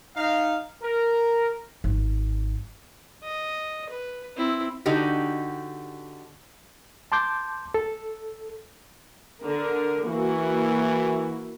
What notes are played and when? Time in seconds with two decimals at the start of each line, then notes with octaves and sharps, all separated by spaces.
0.17 D#4 F5
0.82 A#4
1.84 G#1 F#3
3.23 D#5
3.90 B4
4.36 C4 E4
4.86 D3 D#4 F#4 G4
7.12 A5 C6 D6 G6
7.74 A4
9.42 D3 A#4
10.07 E3 A#3 E4 F#4